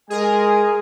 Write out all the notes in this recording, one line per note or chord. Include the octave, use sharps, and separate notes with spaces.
G#3 G#4 A#4 G#5